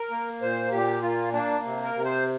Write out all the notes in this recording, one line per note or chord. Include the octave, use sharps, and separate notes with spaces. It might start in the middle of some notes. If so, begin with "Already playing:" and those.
Already playing: A#4
A#3
A#2 C5
A#2 G4
A#3 F4
A#3 D4
C3
A#4
C3
C5